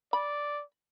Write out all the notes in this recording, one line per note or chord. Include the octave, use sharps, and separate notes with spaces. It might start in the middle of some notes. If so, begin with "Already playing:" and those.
D5 B5